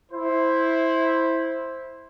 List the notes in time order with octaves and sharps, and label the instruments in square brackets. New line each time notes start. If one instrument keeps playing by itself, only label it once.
[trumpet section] E4 C5